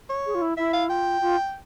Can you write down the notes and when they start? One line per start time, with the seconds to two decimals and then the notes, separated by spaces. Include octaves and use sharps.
0.09 C#5
0.26 G#4
0.35 F4
0.42 E4
0.57 E4 E5
0.73 F5
0.89 F4 G5
1.21 F4